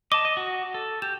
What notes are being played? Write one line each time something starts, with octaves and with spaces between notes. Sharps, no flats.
D#5 A5 D6
D#5
F#4
A4
G4 E7